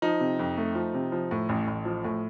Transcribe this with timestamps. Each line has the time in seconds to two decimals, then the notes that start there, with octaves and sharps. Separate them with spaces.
0.02 F3 D#4
0.20 C3
0.39 F2
0.57 A3
0.75 F3
0.94 C3
1.12 F3
1.31 A2
1.49 A1
1.67 A1
1.85 F3
2.04 A2